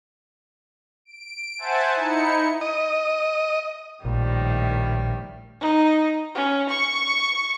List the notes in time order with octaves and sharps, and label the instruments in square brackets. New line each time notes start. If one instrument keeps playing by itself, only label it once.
[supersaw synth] D7
C5 E5 F#5 G#5 A5
D#4 E4 C#7
[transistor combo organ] D#5
[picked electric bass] A#1 [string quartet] A2 D#3 G3
[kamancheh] D#4
C#4
C#6